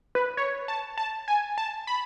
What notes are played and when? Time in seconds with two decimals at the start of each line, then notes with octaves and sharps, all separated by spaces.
0.15 B4
0.37 C#5
0.68 A5
0.98 A5
1.28 G#5
1.58 A5
1.87 B5